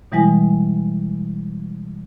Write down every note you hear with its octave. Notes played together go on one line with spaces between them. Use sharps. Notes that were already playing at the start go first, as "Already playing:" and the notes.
B2 E3 G3 G#3 E4 G#5